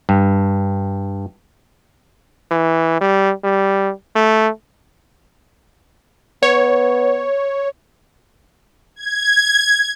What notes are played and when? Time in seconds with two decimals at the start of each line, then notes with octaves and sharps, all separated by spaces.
0.09 G2
2.51 E3
3.01 G3
3.44 G3
4.16 A3
6.43 B3 C#5
8.96 G#6